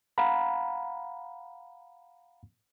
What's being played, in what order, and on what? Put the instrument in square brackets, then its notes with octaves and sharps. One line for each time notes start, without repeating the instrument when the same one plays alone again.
[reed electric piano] F5 F#5 A#5 B5